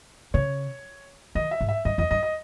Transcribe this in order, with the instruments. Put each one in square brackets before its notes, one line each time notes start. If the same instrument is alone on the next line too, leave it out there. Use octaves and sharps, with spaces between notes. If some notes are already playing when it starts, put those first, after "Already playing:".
[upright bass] C#3 [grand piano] C#5
[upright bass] D#3 [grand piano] D#5
[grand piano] E5
[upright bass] G#2
[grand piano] E5
[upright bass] G2 [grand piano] D#5
[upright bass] E2 [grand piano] D#5
[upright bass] G2 [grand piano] D#5
[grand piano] D#5